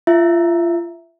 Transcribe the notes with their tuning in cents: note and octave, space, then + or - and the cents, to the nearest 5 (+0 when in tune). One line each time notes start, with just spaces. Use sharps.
F4 -30 E5 +0